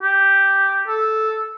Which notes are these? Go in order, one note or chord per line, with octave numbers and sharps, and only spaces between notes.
G4
A4